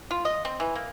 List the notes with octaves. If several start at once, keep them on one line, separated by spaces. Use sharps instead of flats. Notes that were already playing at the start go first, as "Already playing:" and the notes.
F4
D#5
C4
E3
A#3